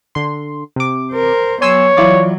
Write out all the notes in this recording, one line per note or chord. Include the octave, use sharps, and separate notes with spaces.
D3 C6
C3 D6
A#4 C5
F#3 B3 C#5 G#5 C6 E6
E3 F#3 E4 F4 D5